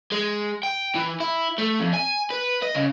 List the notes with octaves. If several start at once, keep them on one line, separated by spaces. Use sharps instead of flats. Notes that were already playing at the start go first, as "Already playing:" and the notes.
G#3
G5
E3
E4
A3
F2
G#5
B4
D#5
C#3